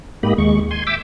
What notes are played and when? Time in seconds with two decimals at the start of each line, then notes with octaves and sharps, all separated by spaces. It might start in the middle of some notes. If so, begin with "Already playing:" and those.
0.23 G#2 A#3 G4 D#5 B5
0.38 D#2 G#3 C#6
0.71 G#5 C6
0.87 E5 G5 D6 E6